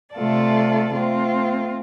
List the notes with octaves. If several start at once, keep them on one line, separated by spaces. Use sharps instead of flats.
C3 A3 F4 A4 D5
A3 C4 F4